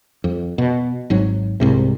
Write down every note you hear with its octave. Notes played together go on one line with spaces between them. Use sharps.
F2
B2
G#1 G#2 F#3
C2 G#2 C3